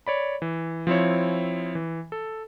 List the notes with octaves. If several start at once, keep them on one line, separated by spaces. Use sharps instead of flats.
C#5 D5 B5
E3
F3 C4 E4 C#5
E3
A4